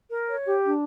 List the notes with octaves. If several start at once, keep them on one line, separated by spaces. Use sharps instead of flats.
A#4
C#5
G4
D4